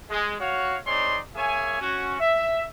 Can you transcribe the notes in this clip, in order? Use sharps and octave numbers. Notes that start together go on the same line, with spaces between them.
G#3
F#4 C#5 F5
G#3 C4 D#4 C#5 D5 C6
A#3 G#4 C#5 E5 G#5
C#4 F#4
E5